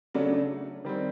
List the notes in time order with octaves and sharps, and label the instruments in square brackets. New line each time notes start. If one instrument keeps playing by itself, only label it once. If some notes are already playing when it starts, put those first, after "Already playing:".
[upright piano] C#3 F#3 A3 D4
D#3 G3 C4